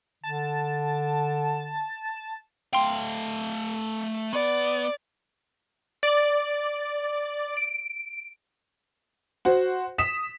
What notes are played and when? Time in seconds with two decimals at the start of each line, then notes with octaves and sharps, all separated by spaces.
0.24 D3 A5
2.73 A3 F5 G5 C6
4.33 B3 D5
6.03 D5
7.57 D7
9.45 F#4 C5
9.98 D#6 B6 E7